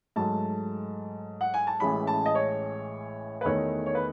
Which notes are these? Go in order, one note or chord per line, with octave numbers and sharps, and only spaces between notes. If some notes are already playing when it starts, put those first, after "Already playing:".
G#2 F#3 A3 A5
F#5
G#5
A5
A1 A2 E3 G#3 C#4 B5
A5
D#5
C#5
B4
E2 D#3 A3 C#5
C#5
B4